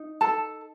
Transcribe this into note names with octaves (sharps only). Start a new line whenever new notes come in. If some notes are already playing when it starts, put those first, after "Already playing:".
Already playing: D#4
A4 A5